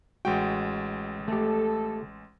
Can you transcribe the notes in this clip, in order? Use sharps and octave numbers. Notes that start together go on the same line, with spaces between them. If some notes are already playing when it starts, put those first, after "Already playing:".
A1 G#3 F#4 G5
A3 G4 A4